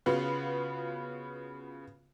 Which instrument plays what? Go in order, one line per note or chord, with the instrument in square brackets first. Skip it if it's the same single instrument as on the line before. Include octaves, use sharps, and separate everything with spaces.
[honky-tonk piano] C#3 B3 F4 F#4